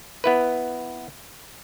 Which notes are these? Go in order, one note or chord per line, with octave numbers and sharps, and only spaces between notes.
B3 E4 B4